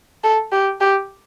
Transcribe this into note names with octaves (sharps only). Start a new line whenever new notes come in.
A4
G4
G4